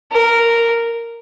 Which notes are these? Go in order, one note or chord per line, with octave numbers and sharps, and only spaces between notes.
A#4